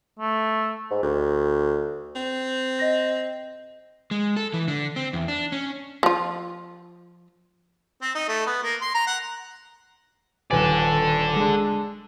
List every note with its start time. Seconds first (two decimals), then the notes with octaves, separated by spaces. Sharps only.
0.19 A3
0.90 G#2
1.03 D2
2.15 C4
2.79 D#5 A#6
4.11 G#3
4.36 A4
4.54 E3
4.68 D3
4.96 C4
5.13 E2
5.28 D4
5.52 C#4
6.03 F3 F4
8.02 C4
8.15 D#4
8.28 A3
8.46 B3
8.63 A#3
8.81 C6
8.94 A#5
9.07 F#5
10.51 D#1 A4 B4 D5 G#5
11.36 G#3 D4